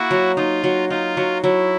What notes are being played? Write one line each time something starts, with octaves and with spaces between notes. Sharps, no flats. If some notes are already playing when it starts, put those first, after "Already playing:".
Already playing: A#3 E4 F#4
F#3
D#4 F4
F#3
D#4 F4
F#3
F#3 E4